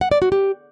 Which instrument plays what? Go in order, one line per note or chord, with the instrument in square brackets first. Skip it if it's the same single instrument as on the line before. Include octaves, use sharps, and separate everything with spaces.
[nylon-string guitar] F#5
D5
F#4
G4